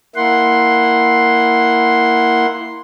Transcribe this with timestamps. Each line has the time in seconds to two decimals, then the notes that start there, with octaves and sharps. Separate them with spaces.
0.16 A#3 E4 F#5 C6